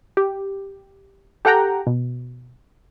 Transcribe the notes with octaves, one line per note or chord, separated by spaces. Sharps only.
G4
G4 A4 F#5 G5 A#5
B2